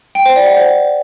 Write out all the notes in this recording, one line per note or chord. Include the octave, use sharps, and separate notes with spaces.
G5
C5
D5
F#5
C5